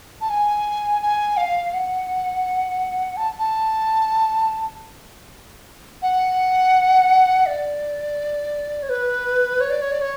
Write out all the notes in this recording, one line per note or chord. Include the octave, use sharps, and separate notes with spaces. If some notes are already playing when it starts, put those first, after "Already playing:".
A5
G#5
G#5
F5
F#5
A5
A5
F#5
D5
C#5
B4
C#5
D5
C#5
D5
C#5